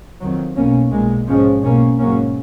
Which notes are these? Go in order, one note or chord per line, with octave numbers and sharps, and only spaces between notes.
F2 D#3 F#3
B1 B2 A#3 C#4
B1 A#2 G#3
G#2 F3 G#3 C#4
B1 B2 A#3 C#4
G#2 F#3 A#3 C#4